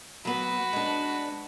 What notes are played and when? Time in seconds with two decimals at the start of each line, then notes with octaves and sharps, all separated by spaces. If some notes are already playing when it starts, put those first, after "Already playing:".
0.25 F#3 B3 F#4 B4
0.73 G#3 D4